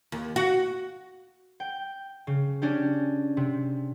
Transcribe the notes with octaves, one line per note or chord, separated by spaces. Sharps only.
D#2
F#4
G5
C#3
C#4 D4 G4
C3